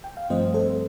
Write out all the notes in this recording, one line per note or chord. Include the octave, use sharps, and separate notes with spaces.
G5
F5
G2 F3 A3 C4 C5 D#5
A4 C5